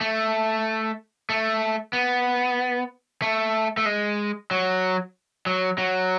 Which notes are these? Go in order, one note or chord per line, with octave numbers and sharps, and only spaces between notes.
A3
A3
B3
A3
A3
G#3
F#3
F#3
F#3